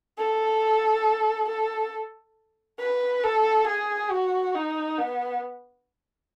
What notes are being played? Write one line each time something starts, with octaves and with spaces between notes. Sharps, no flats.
A4
A4
B4
A4
G#4
F#4
D#4
B3